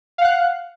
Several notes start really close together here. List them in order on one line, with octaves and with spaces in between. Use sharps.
F5 F#5 F#6